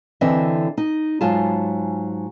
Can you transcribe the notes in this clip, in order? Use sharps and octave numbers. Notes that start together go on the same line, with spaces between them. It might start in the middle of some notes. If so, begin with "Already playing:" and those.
D3 E3 C4 D#5 E5
D#4
G#2 F#3 F4 G#4 A5